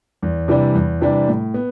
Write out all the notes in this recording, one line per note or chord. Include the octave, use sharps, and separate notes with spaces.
E2
C3 E3 G3 D4
E2
C3 E3 G3 D4
A2
B3